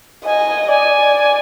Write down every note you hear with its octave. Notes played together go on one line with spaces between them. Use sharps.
D#5 G#5
D5 G#5